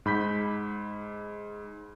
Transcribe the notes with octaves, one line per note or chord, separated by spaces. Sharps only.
G#2 B5 G6 B6